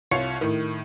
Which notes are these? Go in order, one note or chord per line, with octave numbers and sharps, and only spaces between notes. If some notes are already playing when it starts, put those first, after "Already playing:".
C2 F4 C#5 F5 C#7
A2 D#3